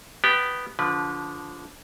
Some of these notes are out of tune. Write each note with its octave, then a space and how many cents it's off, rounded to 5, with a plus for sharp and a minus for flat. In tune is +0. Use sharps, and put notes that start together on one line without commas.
B3 +0 G4 -15
D3 -25 F3 +0 B4 -20